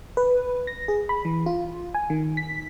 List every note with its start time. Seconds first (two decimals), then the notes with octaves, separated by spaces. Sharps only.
0.17 B4
0.67 A#6
0.88 G#4
1.09 B5
1.25 E3
1.46 F4
1.94 G#5
2.10 D#3
2.37 B6